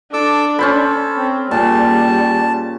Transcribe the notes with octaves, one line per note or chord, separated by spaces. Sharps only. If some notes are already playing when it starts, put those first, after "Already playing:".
D4 A4 D6 E6
C#4 A4 C5 B5
C4
A#2 G3 G#4 A5